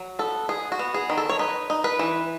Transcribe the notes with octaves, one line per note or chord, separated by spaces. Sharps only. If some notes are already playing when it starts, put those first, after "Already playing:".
Already playing: F#3
B3 A4
B3 G#4
F#4
B3
G#4
D#3
A4
C#5
D#4 B4
D#4
B4
E3